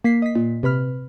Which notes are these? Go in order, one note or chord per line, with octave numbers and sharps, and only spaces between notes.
A#3 B6 C7
D#5 B6
A#2
C3 B4 B5 F6